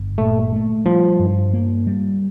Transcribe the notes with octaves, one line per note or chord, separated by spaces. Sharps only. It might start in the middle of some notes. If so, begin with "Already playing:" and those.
Already playing: G1
A#2 A3
A3
F3 G3
G2
A#3
G3